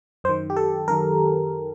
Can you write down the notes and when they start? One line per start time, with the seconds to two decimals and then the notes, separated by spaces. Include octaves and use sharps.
0.24 F#2 D#3 C5
0.50 G4
0.56 A4
0.88 F#2 D#3 A#4